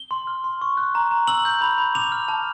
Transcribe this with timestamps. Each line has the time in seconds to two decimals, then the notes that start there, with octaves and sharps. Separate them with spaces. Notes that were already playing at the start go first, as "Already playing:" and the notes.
Already playing: G7
0.11 C6
0.27 F6
0.44 C6
0.61 C#6
0.77 F#6
0.95 A#5
1.11 A#5
1.27 E6 F#7
1.45 G6
1.61 B5
1.78 B5
1.94 D6 F7
2.12 F6
2.28 A5